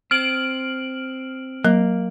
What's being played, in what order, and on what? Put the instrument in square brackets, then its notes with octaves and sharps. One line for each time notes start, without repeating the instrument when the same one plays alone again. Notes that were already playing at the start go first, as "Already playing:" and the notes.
[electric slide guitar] C4 [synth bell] F6 D7 F#7
[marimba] F#3 [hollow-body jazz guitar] A#3